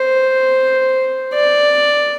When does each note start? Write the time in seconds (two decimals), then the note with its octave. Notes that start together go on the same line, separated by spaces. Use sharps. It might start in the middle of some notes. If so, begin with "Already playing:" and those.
Already playing: C5
1.34 D5